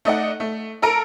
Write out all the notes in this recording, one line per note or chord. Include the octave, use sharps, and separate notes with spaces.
A3 D#4 D5 F#5
A3
A4 A#4 A#5 D7